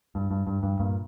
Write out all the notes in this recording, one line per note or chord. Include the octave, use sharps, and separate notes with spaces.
G2
G2
G2
G2
G2 A#2